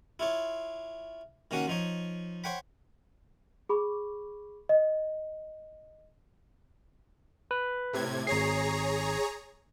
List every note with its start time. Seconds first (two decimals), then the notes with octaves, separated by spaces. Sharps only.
0.19 E4 F4 C#5
1.51 D#3 A#3 C#4 F#4 F#5
1.68 F3 D#4 C#5
2.44 C5 C#5 F#5 G5 B5
3.69 G#4 B5 C#6 D6
4.69 D#5
7.51 B4
7.93 A2 C3 G#6
8.27 G#1 G#4 C#5 A#5 C7